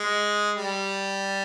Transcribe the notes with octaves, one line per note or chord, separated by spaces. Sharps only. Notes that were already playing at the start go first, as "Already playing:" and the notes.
Already playing: G#3
G3